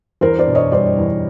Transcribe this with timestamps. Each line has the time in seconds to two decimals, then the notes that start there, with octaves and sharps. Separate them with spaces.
0.21 E2 A#4 C5
0.39 C5 D5
0.47 B2
0.55 C#5 D#5
0.71 G3 C5 D5
0.98 E2